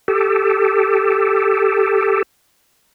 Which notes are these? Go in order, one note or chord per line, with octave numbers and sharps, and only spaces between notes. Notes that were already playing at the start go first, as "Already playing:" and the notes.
G4 A4